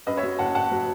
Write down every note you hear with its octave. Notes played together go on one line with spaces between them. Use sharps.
F#2 B4 D#5
C#5 E5
F#3
F#1 F#5 A5
F#1 F#5 A5
F#3